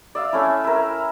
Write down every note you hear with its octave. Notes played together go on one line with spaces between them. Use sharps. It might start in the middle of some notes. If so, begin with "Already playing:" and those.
D5 E5 F5
A3 C#4 E4
E4 A#4